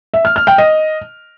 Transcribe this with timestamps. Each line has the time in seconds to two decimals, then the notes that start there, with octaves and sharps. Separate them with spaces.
0.14 E5
0.25 F6
0.36 F6
0.47 G5
0.58 D#5